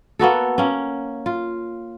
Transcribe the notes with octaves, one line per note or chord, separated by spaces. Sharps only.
A#3 B3 F#4 A4
A#3 C#4
F4